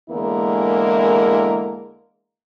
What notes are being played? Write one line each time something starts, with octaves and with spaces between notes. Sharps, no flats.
E2 D3 G#3 A#3 E4 A#4